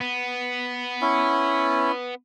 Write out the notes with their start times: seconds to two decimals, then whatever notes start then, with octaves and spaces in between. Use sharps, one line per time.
0.01 B3
1.02 C#4 E4